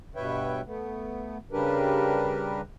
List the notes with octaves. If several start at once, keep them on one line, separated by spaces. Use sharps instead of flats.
G2 B2 B4 C#5 E5 G5
A3 B3
C#3 G3 D4 G4 A#4 B4